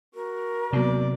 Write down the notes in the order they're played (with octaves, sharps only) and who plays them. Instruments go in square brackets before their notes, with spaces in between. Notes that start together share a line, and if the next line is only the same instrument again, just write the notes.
[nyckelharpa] F#4 [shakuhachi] A#4
[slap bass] C3 F#3 [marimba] A#3 B3 F#4 [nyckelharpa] D5